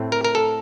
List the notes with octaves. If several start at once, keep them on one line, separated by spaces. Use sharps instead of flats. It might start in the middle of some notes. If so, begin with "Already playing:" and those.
Already playing: A2 A3 C4
A#4
A#4
A4